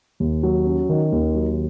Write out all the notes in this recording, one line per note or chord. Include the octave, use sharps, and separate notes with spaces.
D#2
F#3
C#4
D#3
D#2
F#3